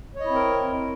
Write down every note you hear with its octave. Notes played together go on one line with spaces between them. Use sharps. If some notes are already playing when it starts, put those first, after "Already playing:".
C4 E4 A#4 C#5 D#5